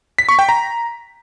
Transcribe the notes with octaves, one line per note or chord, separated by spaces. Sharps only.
B6
C#6
G5
A#5